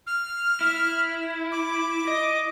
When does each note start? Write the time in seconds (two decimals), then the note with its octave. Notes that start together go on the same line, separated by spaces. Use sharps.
0.07 F6
0.61 E4
1.52 D6
2.07 D#5